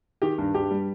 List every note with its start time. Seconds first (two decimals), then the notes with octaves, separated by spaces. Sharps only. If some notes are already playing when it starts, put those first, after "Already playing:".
0.22 D#3 G4
0.38 G2
0.54 G2 G4
0.71 G3